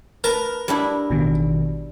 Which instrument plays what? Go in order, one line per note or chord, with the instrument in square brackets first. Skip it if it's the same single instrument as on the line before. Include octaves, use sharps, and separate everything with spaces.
[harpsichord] A#4 [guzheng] B4 A5
[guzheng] G3 D4 E4
[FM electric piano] A1 B2 D#3